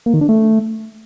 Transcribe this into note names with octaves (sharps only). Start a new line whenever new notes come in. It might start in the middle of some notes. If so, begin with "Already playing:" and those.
A#3
D#3
D4
A3